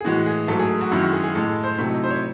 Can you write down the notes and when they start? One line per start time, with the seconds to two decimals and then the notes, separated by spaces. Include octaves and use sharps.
0.01 G#4
0.05 A2 E3 G#3 F#4
0.26 G#4
0.48 G#2 F#3 A3 A4
0.59 G#4
0.70 G#4
0.81 F#4
0.91 F#2 D#3 G#3 E4
1.02 F#4
1.13 G#4
1.24 G#4
1.35 A2 G#3 A4
1.49 A4
1.63 C5
1.78 C3 F#3 A3 E4
1.89 D#4
2.04 C5
2.10 C#5